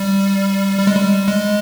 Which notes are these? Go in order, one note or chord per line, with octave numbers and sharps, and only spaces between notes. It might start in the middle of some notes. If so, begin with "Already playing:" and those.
Already playing: G3
G3
G#3
G3
G#3